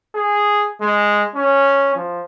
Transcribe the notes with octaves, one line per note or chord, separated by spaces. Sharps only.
G#4
G#3
C#4
F3